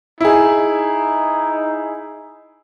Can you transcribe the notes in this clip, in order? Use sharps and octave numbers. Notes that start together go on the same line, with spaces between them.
D#4 E4 G#4